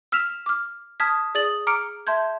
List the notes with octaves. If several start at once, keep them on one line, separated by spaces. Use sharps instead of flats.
E6 F6 B6 E7 F7
D6 F6
A5 D#6 F6 G#6 B6
G#4 D5 D#6 A6 F#7
A#5 D6 F6 C#7 D7
E5 A5 C6 G6 G#6